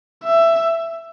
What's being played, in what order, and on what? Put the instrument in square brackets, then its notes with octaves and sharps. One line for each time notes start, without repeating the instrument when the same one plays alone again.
[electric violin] E5